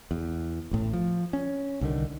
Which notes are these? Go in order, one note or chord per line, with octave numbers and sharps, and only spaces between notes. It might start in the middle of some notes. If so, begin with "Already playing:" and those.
E2
A1 A2
F3
C#4
C2 D3 D#3